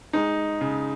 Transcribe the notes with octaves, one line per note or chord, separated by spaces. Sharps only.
G#3 D#4
C#3